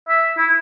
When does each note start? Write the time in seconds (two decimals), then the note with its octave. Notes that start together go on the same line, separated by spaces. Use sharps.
0.08 E5
0.38 E4